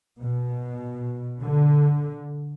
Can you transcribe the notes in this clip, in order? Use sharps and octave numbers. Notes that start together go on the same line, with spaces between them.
B2
D3